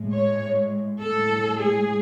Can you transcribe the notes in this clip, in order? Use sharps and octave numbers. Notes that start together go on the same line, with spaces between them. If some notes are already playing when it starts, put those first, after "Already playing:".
Already playing: A2 G#3
C#5
A2 G#3 A4
G#4